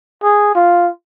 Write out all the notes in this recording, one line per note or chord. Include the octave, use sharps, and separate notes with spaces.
G#4
F4